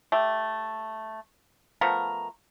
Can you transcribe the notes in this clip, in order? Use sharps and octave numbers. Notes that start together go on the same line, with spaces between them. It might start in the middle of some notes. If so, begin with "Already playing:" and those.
A3 G4
F3 A3 B3 A#4